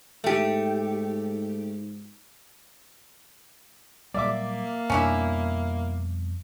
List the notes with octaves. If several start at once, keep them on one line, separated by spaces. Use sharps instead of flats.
G#2 A3 G4
A#2 F#3 G3 A#3 D5 E5 D6
F2 B2 G3 C#4 D4 E4